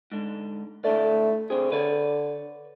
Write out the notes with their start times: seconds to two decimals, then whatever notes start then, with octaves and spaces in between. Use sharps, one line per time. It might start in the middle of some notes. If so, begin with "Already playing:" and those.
0.12 G#2 D3
0.84 A2 D3 A3 D5
1.50 D3 C4 G#4
1.72 D3 B4 C#5 D5